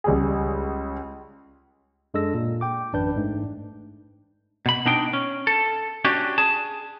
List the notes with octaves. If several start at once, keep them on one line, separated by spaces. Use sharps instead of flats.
C#2 G3 G#4
F#2 G#3 D4 A4 E6 A#6
A#2
G5 D6
A1 F#2 D4 B4 G6
G#2 A3 D4
B2 B5
B2 D4 D#4 G5
C#4
A4
C#4 D4 F#4 G4
G#4 A5